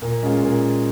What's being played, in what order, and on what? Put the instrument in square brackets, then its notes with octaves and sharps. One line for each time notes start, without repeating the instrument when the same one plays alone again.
[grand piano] A#2
G#3 C#4 F4 G#4
A#2